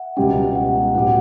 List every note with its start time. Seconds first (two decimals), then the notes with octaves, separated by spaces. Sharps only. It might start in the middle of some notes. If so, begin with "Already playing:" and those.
Already playing: E5 F#5
0.17 C#2 B2 G3 C#4 G4 G5
0.55 F#5
0.95 A2 F#3 C#4 G4 F#5